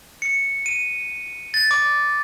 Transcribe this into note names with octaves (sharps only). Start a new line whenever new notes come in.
C#7
D#7
A6
D6